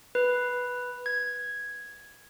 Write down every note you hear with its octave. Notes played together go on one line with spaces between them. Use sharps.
B4
G#6